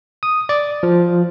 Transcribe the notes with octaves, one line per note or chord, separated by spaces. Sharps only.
D#6
D5
F3